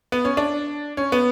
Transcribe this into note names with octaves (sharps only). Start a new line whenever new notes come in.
B3
C#4
D4
C#4
B3